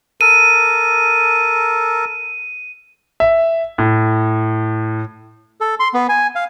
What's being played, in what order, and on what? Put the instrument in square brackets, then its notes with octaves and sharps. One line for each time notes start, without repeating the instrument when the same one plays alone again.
[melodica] A4 A#4 [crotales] D#7
[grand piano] E5
A2
[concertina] A4
C6
B3
G#5
F5